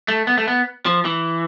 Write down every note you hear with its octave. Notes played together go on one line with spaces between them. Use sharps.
A3
B3
A3
B3
F3
E3